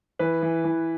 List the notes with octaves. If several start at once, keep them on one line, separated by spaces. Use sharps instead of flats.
E3 B4
E3
E3